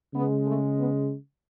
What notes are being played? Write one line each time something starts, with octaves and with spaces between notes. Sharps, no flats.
C#3 G#3 B3
A3
B3